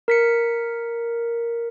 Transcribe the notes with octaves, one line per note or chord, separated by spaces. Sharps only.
A#4 B6 C#7